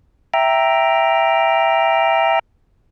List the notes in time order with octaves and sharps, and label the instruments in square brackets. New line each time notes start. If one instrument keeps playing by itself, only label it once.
[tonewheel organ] E5 G5 A#5